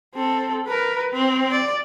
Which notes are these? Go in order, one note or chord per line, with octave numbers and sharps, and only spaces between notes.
C4 A4
A#4 B4
C4
D5